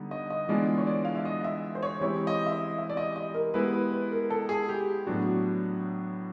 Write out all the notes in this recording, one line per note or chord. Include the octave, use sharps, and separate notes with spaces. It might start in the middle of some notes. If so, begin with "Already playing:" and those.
Already playing: D3 G3 B3 D#4
D#5
D#5
E3 G#3 B3 D4 F4 D5
C#5
D5
F5
E5
D#5
E5
C5
C#5
E3 G#3 C4 E4 G4 C#5
D#5
E5
D#5
E5
D5
D#5
D#5
A#4
G#3 B3 E4 G4 B4
B4
B4
A#4
A4
G#4
G4
A2 F#3 B3 D4 F#4